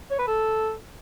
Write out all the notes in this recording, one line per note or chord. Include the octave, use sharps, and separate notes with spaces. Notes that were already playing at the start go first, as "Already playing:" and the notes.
C#5
B4
A4